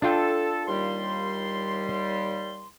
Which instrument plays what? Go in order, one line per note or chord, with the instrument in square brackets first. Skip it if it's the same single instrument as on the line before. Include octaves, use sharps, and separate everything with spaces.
[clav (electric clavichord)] D4 F4 G5 [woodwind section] A4
[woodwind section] D#2 G3 C6